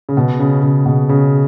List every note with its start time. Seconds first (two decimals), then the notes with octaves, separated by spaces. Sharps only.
0.09 C#3
0.17 B2
0.39 C#3
0.62 C#3
0.86 B2
1.09 C#3